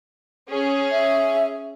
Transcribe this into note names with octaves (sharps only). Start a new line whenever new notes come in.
C#4 G#4
E5